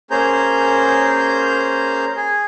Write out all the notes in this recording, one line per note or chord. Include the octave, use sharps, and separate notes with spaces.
A#3 C#4 G#4 C5 A#5 G6
G#4